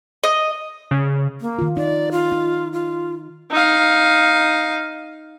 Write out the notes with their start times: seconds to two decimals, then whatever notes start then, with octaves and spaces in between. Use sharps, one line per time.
0.24 D#5
0.91 C#3
1.41 A#3
1.59 D#3 F4
1.77 D#4 D5
2.12 F4
2.32 D#4
2.73 F4
3.51 D#4 F5